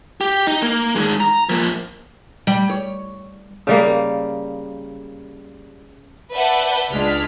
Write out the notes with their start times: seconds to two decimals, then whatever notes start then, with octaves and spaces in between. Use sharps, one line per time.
0.21 G4
0.47 D#4
0.62 A#3
0.96 D#3 G#3
1.20 A#5
1.49 F3 A#3
2.47 G3
2.70 C#5
3.67 C#3 G3 A#3
6.33 B4 D5 E5 F#5 A5 G6
6.91 C#2 G#3 D4 F6 B6